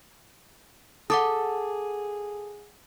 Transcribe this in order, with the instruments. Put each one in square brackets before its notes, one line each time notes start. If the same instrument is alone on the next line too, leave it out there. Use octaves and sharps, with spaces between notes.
[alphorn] G#4 [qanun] A4 [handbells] F#5 D6 D#6